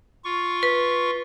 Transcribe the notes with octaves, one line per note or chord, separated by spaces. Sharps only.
F4 C#6
B4